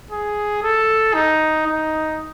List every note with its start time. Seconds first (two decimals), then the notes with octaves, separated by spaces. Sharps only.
0.11 G#4
0.63 A4
1.14 D#4
1.67 D#4